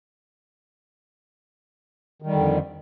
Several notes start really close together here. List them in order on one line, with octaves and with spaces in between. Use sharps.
D#3 G3 D3 F2